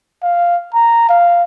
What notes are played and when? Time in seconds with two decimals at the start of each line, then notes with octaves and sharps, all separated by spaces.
0.23 F5
0.74 A#5
1.09 F5